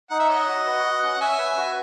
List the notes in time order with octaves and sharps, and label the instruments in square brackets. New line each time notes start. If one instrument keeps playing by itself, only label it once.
[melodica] D#4 [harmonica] F#5
[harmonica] E5
[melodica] C#5 [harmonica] D#5 F#5
[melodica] F#4
B4
F#4
C#4
[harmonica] F#5
[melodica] C#4 [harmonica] E5 G#5
[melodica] B4
F#4